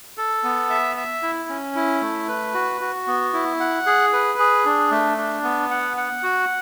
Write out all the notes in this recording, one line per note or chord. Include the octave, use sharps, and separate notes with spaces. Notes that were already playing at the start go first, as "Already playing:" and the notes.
A4
B3
E5
E5
E4
C#4
E4
A3
B4
F#4
F#4
B3
E4
F#5
G#4
B4
G#4
D4
A3
D4
B3
F#5
F#5
F#4